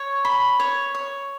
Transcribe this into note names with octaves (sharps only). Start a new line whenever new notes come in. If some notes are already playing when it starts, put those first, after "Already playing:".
Already playing: C#5
B5
C#5
C#5